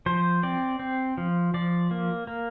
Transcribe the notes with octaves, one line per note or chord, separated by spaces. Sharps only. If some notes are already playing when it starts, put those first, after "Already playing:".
F3 C5
C4 D5
C4
F3
F3 D5
A#3
A#3